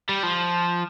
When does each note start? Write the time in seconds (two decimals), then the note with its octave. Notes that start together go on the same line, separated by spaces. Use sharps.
0.09 G3
0.23 F3